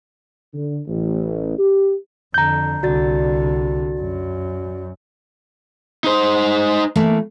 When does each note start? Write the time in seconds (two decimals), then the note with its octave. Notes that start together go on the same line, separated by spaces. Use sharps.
0.53 D3
0.87 A1
1.58 G4
2.34 F2 D3 A#5 G6
2.83 C2 D3 F#4 D5 A6
4.00 F#2
6.04 D#4 C5
6.96 E3 A3 A#3